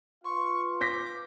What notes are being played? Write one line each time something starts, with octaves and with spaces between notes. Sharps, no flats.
F4 B4 F5 C6 C#6
D6 G6 A#6 B6